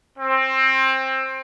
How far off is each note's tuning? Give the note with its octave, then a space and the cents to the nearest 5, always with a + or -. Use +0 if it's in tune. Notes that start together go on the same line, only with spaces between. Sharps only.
C4 +20